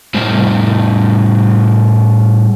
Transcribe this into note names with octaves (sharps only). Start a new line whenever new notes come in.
A2 G3 C5